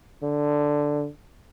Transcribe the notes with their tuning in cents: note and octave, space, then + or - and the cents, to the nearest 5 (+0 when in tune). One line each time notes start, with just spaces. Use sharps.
D3 +0